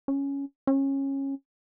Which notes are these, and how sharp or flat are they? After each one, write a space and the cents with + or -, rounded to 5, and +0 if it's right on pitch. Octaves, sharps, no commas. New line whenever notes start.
C#4 +5
C#4 -20